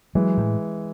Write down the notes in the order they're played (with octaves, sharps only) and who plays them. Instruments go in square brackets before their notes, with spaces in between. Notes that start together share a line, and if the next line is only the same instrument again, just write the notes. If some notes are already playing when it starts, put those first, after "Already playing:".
[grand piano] E3 G#3 [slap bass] F#3
[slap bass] A2